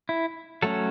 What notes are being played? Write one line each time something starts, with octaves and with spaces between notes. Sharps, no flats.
E4
F#3 A3 C#4 A4